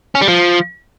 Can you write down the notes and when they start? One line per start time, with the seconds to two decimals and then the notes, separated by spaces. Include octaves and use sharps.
0.15 C#4
0.21 G3
0.28 F3